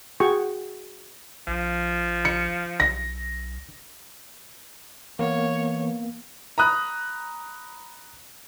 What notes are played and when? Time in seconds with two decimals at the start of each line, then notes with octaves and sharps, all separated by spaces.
0.20 F#4 G#4 G5 C#6
1.47 A#1 F3
2.25 C#7
2.80 B1 A#6
5.19 E3 A#3 B3 C#5
6.58 A#5 B5 D#6 F#6